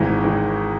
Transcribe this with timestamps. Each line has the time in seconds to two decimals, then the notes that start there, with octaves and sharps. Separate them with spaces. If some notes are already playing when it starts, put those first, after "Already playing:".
Already playing: G#1 G#2 E3 G#3
0.24 E3 G#3